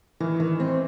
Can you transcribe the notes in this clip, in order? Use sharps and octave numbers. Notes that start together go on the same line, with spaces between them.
D#3 E3
D#3
C4